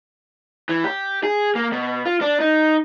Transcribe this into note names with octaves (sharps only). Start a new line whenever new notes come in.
E3
G4
G#4
A#3
B2
F4
D4
D#4